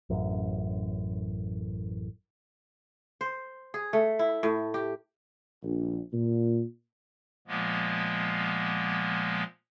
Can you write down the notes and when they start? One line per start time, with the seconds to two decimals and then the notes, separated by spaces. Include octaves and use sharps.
0.10 A1 F#2
3.21 C5
3.74 G#4
3.93 A3
4.19 E4
4.43 A2
4.74 G4
5.63 A#1
6.12 A#2
7.48 A#2 F3 G#3 A#3 B3